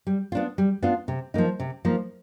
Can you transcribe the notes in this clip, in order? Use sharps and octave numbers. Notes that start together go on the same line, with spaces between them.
G3
B3 D4 F4
G3
B3 D4 F4
C3
F3 A#3 D#4
C3
F3 A#3 D#4